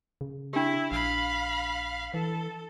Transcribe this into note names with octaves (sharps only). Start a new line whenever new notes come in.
C#3
D4 E4 G4
A#1 F5 B5
E3 A4